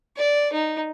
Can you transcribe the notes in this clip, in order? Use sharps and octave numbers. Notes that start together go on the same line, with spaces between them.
D5
D#4